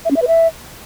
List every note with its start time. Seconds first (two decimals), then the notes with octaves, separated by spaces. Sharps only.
0.05 E5
0.11 C#4
0.16 E5
0.22 B4
0.27 E5